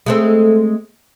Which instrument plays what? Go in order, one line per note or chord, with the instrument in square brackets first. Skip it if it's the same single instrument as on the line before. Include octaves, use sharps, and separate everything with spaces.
[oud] G#3 A3 C4